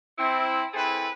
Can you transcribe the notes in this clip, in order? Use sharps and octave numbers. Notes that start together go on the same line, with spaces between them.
C4 E4
C4 E4 G#4 A4 B4